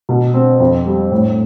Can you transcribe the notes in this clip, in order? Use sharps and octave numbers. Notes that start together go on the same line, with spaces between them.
B2
C4
F2
G3
A2